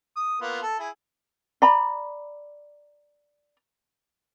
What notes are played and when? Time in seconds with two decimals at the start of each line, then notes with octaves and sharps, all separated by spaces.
0.16 D#6
0.41 A#3 B3 F4
0.62 A4
0.79 E4 G#4
1.62 D5 A#5 B5